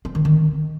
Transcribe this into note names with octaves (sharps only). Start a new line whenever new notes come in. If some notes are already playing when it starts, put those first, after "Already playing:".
C4
D#3
D#3